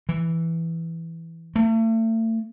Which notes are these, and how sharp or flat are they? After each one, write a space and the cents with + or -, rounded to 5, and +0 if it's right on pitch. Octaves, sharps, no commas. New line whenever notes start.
E3 +0
A3 +35